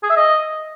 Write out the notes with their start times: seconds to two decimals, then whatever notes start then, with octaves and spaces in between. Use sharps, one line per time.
0.03 G#4
0.10 E5
0.17 D#5